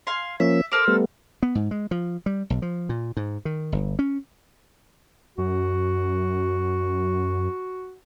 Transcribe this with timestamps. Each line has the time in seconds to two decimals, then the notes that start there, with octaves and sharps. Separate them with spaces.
0.07 F5 G#5 C6
0.40 F3 A#3 C#4 E5
0.72 A4 A#4 C5 D6
0.88 G3 A3 B3
1.43 B3
1.55 G#2
1.71 G#3
1.91 F3
2.26 G3
2.50 B1
2.62 F3
2.89 A#2
3.17 G#2
3.45 D#3
3.72 G1
3.99 C#4
5.38 F#2 F#4